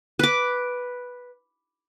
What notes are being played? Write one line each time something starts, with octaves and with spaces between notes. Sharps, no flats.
B4 D6